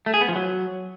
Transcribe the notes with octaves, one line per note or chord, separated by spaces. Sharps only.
A3
G#4
B3
F3
F#3